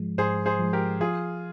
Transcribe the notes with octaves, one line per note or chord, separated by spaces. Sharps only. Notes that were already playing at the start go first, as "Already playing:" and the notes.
Already playing: G#2 F3 G#3
G#2 G#4 C5
G#4 C5
F3 G#3
G4 A#4
F3 F4 G#4